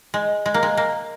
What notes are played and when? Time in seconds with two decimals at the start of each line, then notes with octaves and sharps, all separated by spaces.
0.14 G#3
0.46 G#3
0.54 A#3
0.63 G#3
0.77 A#3